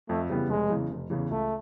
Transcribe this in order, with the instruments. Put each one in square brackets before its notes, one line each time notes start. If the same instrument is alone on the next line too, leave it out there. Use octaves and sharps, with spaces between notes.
[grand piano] F2 [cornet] A3
[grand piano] C#3 E3 G3 B3
[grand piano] F1 [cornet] G#3
[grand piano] E2 C#3 E3
F1
E2 C#3 E3
[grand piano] C#2 [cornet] A3